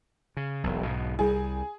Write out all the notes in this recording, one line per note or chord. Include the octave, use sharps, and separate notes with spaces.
C#3
E1 B1
B1 G#2 B2
C2 G3 G#4